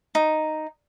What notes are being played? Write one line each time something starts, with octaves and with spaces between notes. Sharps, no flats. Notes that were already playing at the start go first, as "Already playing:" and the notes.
D#4